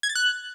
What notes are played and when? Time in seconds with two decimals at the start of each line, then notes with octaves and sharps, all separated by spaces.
0.03 G#6
0.09 A6
0.15 F#6